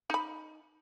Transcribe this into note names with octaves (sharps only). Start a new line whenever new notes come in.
D#4 B5